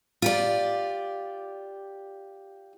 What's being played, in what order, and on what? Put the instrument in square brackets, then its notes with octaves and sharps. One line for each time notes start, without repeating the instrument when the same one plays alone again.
[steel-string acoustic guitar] F4 G4 D5